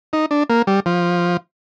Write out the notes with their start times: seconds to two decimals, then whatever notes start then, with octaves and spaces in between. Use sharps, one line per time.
0.13 D#4
0.31 D4
0.50 A#3
0.67 G3
0.86 F3